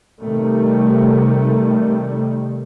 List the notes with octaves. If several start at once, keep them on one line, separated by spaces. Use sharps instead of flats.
C3 D#3 G3 A3